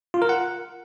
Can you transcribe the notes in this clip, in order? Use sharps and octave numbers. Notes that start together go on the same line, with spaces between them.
F4
A#4
F#5